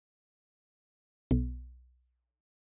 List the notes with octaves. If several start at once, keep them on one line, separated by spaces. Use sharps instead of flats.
B1